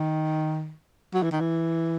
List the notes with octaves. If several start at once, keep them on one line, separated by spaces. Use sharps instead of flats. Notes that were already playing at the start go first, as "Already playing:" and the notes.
Already playing: D#3
F#3
E3
D#3
E3